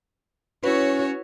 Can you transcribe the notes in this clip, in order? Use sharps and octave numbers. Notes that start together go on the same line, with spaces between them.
C#4 E4 F#4 B4 C#5